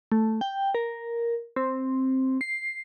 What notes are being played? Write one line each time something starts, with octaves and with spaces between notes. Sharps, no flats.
A3
G5
A#4
C4
C7